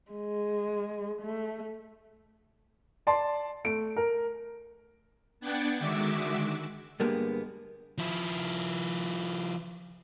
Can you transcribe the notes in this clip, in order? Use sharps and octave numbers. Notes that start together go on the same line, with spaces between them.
G#3
A3
D5 A5 C6
A3 D7
A#4
B3 D4 F#5 G5 G#6 A6
D3 D#3 G#3 F#4 E5 D6
G2 D3 G3 G#3 A#3 B3
F3 E4